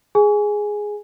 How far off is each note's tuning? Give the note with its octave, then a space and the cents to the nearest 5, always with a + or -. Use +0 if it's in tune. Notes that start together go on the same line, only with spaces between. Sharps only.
G#4 +0 G#5 +0